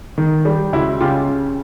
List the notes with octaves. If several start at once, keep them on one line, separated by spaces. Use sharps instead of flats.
D#3
G3
C#2 E4 F#4
C#3 F4 G4